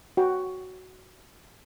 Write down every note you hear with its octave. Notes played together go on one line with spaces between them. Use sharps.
F#4 G5